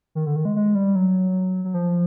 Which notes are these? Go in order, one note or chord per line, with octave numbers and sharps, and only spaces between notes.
D#3
D3
D#3
G#3
G#3
G3
F#3
F#3
F3